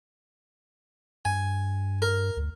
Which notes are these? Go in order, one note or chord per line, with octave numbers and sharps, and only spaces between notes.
G2 G#5
A#4
D2